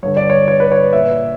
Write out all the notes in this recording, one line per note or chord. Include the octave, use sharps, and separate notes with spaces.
G2 D3 C#5
D5
C#5
C#5
B4
C#5
A#2 E5